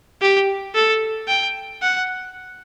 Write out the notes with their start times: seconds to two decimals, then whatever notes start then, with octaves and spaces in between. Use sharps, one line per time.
0.22 G4
0.75 A4
1.28 G5
1.82 F#5